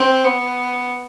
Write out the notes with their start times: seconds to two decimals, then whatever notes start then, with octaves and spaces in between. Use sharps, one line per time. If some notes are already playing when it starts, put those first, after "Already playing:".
Already playing: C4
0.24 B3